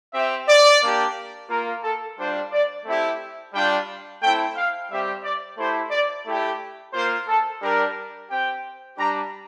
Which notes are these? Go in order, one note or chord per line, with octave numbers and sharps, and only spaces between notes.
C4 G4 E5
D5
A#3 D4 G4
A#3 F4 A#4
A4
G3 D4 F4 C5
D5
A3 C4 E4 G4
G3 D4 F4 G5
A3 C4 E4 G5
F5
G3 C4 G4 E5
D5
A3 E4 G4 C5
D5
A3 E4 G4
A#3 F4 C5
A4
G3 D4 G4 A#4
C4 G4 G5
G3 D4 G4 A#5